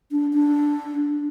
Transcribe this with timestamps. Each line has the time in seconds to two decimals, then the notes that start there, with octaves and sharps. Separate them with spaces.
0.11 D4
0.33 D4